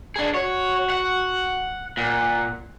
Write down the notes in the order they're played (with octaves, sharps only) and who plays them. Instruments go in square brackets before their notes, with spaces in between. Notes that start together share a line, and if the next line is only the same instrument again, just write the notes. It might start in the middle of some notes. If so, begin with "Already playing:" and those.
[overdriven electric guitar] D4 G#4
[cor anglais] F#4 [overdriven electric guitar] C#5
[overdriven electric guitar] F#5
[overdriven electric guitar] A#2 [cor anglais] F#5